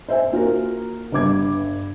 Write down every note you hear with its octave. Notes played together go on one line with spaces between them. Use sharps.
C5 E5 G#5
A#3 F4 F#4 A#4
G1 G2 D6 G#6